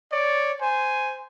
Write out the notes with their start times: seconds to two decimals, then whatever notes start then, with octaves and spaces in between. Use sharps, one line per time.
0.13 C#5 D5
0.60 C5 G#5